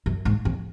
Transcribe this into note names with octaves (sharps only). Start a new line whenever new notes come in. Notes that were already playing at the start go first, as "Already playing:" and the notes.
F#2
G#2
F2